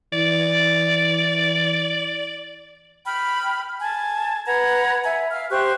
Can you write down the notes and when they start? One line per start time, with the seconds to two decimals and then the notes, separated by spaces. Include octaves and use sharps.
0.13 E3 D5
3.05 G5 B5 F6
3.80 G#5 A5
4.47 B4 F#5 A#5 G#6
5.04 E5 G#5
5.31 E5 F5 F6
5.50 G4 C5 C#6 F#6